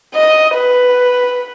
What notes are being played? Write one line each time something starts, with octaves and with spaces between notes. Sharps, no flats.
D#5
B4